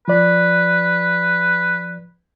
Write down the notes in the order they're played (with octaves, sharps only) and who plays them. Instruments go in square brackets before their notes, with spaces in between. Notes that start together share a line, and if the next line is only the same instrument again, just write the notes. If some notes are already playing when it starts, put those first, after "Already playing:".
[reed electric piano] F3 D5 [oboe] B4